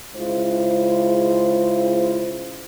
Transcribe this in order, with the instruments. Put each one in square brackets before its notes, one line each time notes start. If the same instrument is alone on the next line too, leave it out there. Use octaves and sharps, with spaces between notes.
[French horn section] C#3 G#3 E4 F4 C5